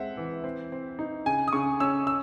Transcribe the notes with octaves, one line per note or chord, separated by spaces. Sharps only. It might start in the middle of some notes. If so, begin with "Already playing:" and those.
Already playing: G#3 C4 E5 F#5
E3
C4
C4
D#4
C#3 G#5
D#6
C#3 C#6
C#4 E6
E6